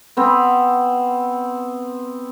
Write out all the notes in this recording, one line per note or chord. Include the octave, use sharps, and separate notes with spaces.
B3 C4